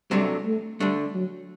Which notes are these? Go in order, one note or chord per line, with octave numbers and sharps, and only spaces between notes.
C3 F#3 G3 A3 D4
A3
D3 G3 A3 D4
F#3